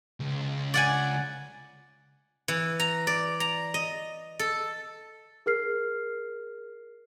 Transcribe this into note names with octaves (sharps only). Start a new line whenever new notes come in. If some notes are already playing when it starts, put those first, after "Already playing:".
C#2
D5 F#5 G#5
E3
A#5
D5
A#5
D#5
A4
G#4 A#4 F6 C7